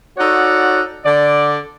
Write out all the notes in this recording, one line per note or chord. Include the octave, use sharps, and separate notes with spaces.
D#4 F#4 A4 C#5 D5 F#5
D3 D5